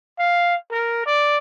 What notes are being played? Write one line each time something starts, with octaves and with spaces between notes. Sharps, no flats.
F5
A#4
D5